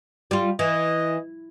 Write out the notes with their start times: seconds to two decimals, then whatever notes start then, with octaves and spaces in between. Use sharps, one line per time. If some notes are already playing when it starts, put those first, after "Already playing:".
0.31 G3 F4
0.59 E3 D#5